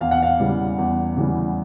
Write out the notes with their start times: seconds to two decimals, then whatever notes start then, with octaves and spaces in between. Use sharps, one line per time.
0.01 E2 F5
0.11 F#5
0.23 F5
0.40 C#3 E3 G3
0.78 E2
1.17 C#3 E3 G3